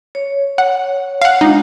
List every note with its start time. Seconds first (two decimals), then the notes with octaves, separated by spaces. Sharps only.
0.15 C#5
0.58 F#5
1.22 F5 F#5
1.41 G#3 D4 D#4 F4